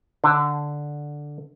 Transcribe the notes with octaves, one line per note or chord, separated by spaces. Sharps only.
D3